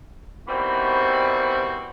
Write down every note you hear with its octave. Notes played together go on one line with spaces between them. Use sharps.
B2 D#3 E3 G3 C4 F#4